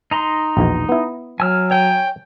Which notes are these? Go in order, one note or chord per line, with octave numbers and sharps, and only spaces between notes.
D#4 A#5 C6
A#1 E2 B2
B3 E4
F#3 G#5 E6 F6
C#5 G5 G#5